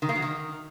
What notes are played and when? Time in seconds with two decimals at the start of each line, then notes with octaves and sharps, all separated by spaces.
0.02 D#3
0.09 A#3
0.16 F#3
0.22 D#3